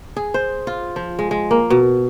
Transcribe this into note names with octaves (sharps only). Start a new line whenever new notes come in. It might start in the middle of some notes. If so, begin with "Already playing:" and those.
G#4
C5
F4
F3
G#3
G#3
A#3
B2